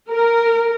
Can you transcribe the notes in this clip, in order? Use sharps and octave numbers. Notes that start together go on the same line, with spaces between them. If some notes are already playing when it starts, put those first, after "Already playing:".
A#4